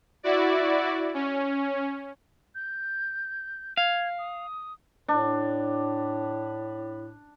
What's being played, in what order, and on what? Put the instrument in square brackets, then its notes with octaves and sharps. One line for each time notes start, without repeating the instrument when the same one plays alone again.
[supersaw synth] E4 F#4 D5
C#4
[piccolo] G6
[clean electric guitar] F5 [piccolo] G#6
[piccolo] D#6
[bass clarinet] A2 [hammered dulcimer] D4